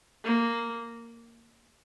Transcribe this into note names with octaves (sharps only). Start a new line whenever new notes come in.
A#3